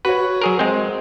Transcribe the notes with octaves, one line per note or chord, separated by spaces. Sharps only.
F#4 B4 C#5
F#3 G#4 A#4
G#3 C4 C5